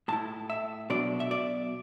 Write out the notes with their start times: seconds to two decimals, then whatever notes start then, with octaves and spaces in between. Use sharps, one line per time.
0.08 A2 A3 E4 A5
0.50 E5
0.90 B2 F#3 D4 D5
1.20 E5
1.31 D5